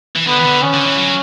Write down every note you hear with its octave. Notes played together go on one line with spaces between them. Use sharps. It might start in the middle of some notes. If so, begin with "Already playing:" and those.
E3
D3 B3
E3
D3
C#4
D3
E3
F#3